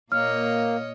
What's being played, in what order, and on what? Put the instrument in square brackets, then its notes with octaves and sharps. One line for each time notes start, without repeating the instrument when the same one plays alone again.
[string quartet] A#2 C#5 D#5 [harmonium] A#3 [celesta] F6